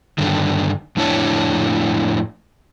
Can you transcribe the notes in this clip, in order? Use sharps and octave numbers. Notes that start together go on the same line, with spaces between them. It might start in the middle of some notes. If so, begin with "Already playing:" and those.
G2 D3 D#3
F2 A2 D4 E4 C#5 A5